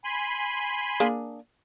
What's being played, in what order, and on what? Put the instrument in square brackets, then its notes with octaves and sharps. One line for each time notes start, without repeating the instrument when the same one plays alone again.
[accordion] G#5 B5 C6
[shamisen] A#3 D4 G#4